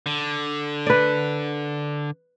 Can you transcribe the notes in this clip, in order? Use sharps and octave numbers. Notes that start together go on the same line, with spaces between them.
D3
B4 D5